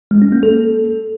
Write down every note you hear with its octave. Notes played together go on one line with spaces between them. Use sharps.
G#3
C#4
A#3
A4